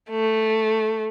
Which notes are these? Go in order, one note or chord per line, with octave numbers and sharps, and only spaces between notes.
A3